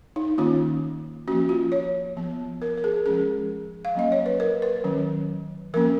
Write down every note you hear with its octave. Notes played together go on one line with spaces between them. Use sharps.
D#4
D#3 A#3 C#4 F4
F3 A#3 C#4 F#4
F4
C#5
F3 B3
A#4
A#4
G#4
F3 G#3 C#4 G#4
F5
F#3 A#3 C#4 D#5
C#5
B4
A#4
B4
D#3 F#3 C#4
F3 A#3 C#4 A#4